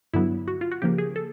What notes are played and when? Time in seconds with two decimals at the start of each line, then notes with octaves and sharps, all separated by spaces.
0.13 G2 D3 F#3 B3 E4
0.48 F#4
0.61 F4
0.72 F#4
0.82 C#3 F3 A#3 G4
0.98 G#4
1.16 A4